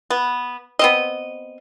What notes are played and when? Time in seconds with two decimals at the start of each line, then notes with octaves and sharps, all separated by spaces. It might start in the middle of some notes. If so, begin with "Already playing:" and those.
0.10 B3
0.79 B3 C4 D#5